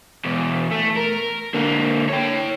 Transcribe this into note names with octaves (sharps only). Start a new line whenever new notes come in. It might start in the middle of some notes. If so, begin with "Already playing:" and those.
E2 B2
A3
A#4
D3 A#3
C#5 G5